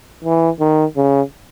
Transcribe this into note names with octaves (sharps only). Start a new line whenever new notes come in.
E3
D#3
C#3